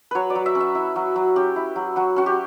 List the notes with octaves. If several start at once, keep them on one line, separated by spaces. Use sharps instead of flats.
F#3 B4 C#5
D5
F#3
E5
C#4
E5
E4
F#3
F#3
C#4 G4
E4
F#3
F#3 F#4
C#4 F#4
G4